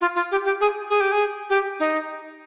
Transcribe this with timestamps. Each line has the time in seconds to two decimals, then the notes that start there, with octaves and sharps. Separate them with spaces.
0.01 F4
0.15 F4
0.31 G4
0.45 G4
0.60 G#4
0.90 G#4
1.00 G4
1.12 G#4
1.49 G4
1.79 D#4